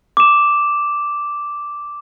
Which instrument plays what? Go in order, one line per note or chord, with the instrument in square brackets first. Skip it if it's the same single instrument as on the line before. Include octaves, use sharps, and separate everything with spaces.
[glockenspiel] D6 E7